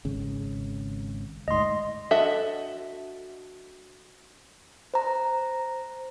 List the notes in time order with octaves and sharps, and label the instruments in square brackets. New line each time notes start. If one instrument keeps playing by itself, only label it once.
[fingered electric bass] G#1 C#3
[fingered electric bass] D2 G#2 [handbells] D#5 C6
[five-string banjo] D4 F#4 A4 D#5 E5
[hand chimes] C5 A#5